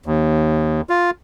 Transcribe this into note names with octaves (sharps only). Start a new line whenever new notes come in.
D#2
F4